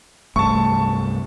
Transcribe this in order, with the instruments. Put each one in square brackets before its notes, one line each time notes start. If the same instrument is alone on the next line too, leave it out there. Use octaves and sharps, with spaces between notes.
[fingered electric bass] C2 G2 A3 [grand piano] A5 C#6